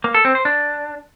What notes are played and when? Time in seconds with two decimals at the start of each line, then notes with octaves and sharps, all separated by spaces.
0.04 A#3
0.14 A4
0.25 C4
0.35 C5
0.45 D4